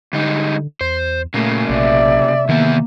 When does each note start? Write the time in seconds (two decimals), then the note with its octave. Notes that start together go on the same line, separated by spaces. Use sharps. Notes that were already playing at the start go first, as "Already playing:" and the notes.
0.13 G#2 D3 G3 D#4
0.81 E2 C5
1.34 A#2 C#3 A3 A#3
1.69 A#1 C3 D5 E5
2.49 E2 D#3 A#3 B3 E5